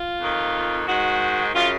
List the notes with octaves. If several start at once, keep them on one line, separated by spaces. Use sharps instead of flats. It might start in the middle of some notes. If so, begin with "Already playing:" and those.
Already playing: F4
F2 D#3
G#2 D#3 F#4
F#2 C#3 F4